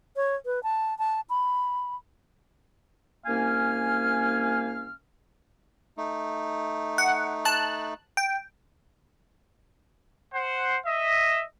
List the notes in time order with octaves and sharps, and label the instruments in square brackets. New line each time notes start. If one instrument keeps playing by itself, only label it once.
[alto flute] C#5
B4
A5
A5
B5
[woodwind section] C2 A#3 C#4 F5 G#5 F6
[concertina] A3 D#4
[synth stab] F#5
A5 F#6
G5
[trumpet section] C5 F#5
D#5 E5